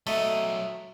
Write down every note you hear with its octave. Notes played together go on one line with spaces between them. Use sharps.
F#3 A3 D#5